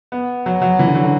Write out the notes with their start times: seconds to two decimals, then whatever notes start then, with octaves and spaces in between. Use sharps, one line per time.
0.12 B3
0.46 F#3
0.62 F#3
0.79 E3
0.87 D3
0.95 F#3
1.04 D3